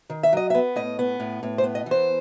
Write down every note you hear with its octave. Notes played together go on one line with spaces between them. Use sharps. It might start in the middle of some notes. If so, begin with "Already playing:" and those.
D#3
E5
F#3 D#5
E5
B3
A2 D#5
B3
A2
A2
C5
B3
D#5
E3
C5